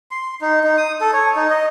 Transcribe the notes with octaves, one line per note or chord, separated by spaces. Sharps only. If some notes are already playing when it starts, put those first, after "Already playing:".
C6
D#4
D#4
D#6
A4
C#5
D#4
D#5